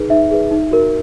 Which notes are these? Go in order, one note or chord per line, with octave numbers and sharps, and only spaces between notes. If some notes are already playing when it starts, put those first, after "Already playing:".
Already playing: D#4 G#4 B4
D#4 E5
G#4 B4
D#4
F#4 A#4